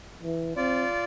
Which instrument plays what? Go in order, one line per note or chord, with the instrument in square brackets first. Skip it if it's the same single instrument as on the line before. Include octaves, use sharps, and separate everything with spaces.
[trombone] E3
[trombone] C4 [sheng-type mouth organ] F4 D5